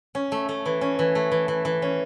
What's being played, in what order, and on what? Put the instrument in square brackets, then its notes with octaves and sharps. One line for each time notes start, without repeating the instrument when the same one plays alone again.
[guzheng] C#4
A3
A3
E3
C#4
E3
A3
E3
E3
E3
C#4